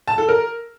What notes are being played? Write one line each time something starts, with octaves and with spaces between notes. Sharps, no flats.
A5
A4
A#4